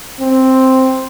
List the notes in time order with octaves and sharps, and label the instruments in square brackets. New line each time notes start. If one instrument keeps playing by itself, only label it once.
[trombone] C4